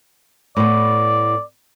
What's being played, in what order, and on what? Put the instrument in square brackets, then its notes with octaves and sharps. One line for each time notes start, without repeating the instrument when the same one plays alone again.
[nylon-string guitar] A2 B3 [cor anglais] D5